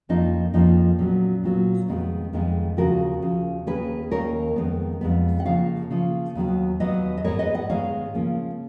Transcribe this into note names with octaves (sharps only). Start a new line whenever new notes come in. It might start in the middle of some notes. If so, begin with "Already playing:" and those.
F2 F3 A#3 C#4 D#4
F2 F3 A#3 C#4 D#4
A#2 F#3 B3 C#4
A#2 F#3 B3
F2 D#3 G#3 B3
F2 D#3 G#3 B3
D#2 C#3 F3 F#4 A#4
D#2 C#3 F3
D#2 D#3 A#3 C#4 G#4 B4
D#2 D#3 A#3 C#4 A#4 C#5
F2 D#3 G#3 B3
F2 D#3 G#3 B3
F#5
C#3 F3 A#3 C#5 F5
C#3 F3 A#3
D#2 D#3 F#3 B3
D#2 D#3 F#3 B3 B4 D#5
D#5
G#2 D#3 G#3 B3 A#4 C#5
B4 D#5
D#5 F#5
G#2 D#3 G#3 B3 C#5 F5
C#3 F3 A#3 C#4